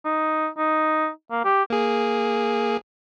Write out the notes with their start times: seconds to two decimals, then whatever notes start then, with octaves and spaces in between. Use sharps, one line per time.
0.05 D#4
0.57 D#4
1.31 A#3
1.44 G4
1.70 A#3 G#4